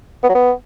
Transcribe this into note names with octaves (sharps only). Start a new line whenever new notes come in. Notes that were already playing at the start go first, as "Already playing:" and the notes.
B3
F#3
B3